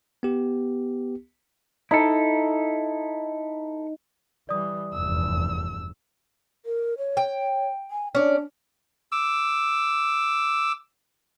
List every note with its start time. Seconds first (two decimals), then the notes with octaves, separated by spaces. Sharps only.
0.23 B3 G4
1.91 D#4 E4 A4
4.49 E3 G3 D5 D#6
4.94 F1 E2 G2 E6
6.66 A#4
6.98 C#5
7.17 G5
7.91 G#5
8.15 C#4 D4 D5
9.12 D6 E6